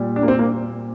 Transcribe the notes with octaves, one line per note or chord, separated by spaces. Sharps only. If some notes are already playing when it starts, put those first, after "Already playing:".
Already playing: A#2 G3
D4
A#3
C4
A#3